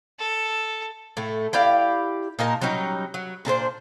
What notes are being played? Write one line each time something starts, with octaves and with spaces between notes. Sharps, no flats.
A4
A2 A3
E4 G4 D5 F5
A#2 D#4 A#4 A5
F#3 G3 C#4 D#4
F#3
A#2 D4 A4 C5